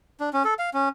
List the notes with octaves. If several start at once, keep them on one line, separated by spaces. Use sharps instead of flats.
D4
C#4
A4
F5
C#4